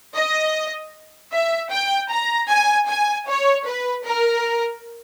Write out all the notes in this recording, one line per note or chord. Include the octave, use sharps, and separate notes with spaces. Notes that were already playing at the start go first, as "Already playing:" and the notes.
D#5
E5
G5
A#5
G#5
G#5
C#5
B4
A#4